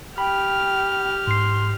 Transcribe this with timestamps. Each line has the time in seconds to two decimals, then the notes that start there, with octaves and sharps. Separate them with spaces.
0.18 G4 G5 B5 F6
1.27 G#2 C6 C7